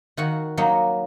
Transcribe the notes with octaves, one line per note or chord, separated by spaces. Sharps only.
D#3 F#4 F#5
F#3 A#3 D#4